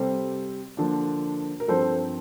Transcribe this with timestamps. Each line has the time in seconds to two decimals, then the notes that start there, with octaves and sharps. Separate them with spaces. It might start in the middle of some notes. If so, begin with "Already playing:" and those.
Already playing: C3 G3 C4 A4 C5
0.77 D3 F3 A#3 D4
1.60 A#4
1.68 G2 F3 C4 A4 C5